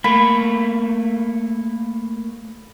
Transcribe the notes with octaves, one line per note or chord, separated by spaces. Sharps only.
A3 A#3 B5